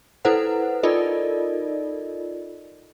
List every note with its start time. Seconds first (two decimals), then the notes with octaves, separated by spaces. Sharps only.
0.25 E4 A4 B4 C5 F#5
0.83 D#4 F4 A4 A#4 D5 D#5